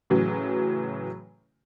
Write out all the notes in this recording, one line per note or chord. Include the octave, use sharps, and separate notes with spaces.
A2 C#3 E3 F#3